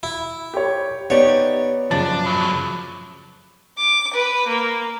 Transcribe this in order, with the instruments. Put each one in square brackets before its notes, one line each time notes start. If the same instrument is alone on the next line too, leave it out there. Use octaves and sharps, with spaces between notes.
[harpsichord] E4
[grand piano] G4 C#5
[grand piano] B3 D5 [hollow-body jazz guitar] D#4 G4 [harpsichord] C#5
[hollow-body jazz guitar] F#2 C#3 F3 [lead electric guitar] D4 [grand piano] A6
[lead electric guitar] A2 F#3
[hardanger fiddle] D6
B4
A#3